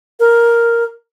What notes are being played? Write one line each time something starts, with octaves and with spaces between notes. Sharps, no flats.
A#4